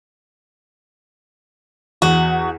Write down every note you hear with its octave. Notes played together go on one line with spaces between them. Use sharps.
E2 F#4